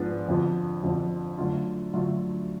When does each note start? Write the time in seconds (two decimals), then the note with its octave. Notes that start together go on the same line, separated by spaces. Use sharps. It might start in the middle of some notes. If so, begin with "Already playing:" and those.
Already playing: G#2 F3 B3 D4
0.28 F2 D3 F3
0.83 F2 D3 F3
1.38 D3 F#3 A3 F4
1.93 D3 F#3 A3 F4